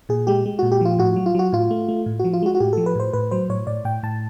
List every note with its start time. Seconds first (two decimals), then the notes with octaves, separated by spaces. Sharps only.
0.09 A#2 G#4
0.27 G#3 G4
0.46 G#3
0.59 A#2 F#4
0.72 G4
0.81 F3 F4
0.99 A2 F#4
1.16 F#3
1.26 F4
1.35 F#3 F#4
1.52 A2 F4
1.71 A3
1.89 A3
2.06 A2
2.19 F#4
2.25 F3
2.33 F4
2.43 G#3 F#4
2.55 F#4
2.60 A2 G4
2.73 F3 A4
2.86 B4
2.96 A2 C5
3.13 A2 B4
3.31 F#3 C5
3.49 A2 C#5
3.67 A2 D5
3.85 A2 G5
4.03 A2 A5